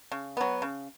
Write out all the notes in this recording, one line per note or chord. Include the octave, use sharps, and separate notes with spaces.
C#3
F#3 B3
C#3